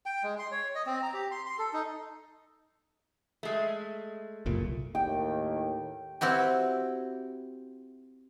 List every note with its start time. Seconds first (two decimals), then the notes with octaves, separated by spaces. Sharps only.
0.06 G5
0.23 G#3
0.39 C6
0.51 C#5
0.75 D#5
0.86 C4
1.03 A#5
1.14 G4
1.31 C6
1.46 C6
1.59 A4
1.73 D#4
3.43 G#3 A3
4.46 F#1 C2 A#2
4.95 D#2 A2 D#3 G5
6.21 C4 E4 F#4 G4